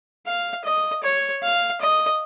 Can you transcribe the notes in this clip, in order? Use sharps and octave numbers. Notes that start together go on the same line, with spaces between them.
F5
D#5
C#5
F5
D#5